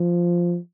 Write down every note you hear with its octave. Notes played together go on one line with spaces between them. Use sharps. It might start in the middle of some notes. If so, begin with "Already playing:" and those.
Already playing: F3